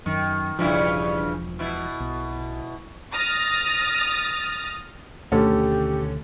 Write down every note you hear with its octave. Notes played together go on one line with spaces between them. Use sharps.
F#2 D#3
E1 G2 C#3 F3 E4
B2 E4
B1
D#6 F6 A6 A#6
D2 B2 D3 D#3 A3 C#4 G4 A4